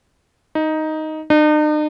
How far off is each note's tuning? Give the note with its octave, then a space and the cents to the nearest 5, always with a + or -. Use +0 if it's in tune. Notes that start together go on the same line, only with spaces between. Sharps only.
D#4 +5
D#4 -45